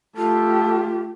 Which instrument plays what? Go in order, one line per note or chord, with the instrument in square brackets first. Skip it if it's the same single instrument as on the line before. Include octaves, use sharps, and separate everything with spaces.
[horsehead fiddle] A3 G4 [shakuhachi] F4 [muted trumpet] A4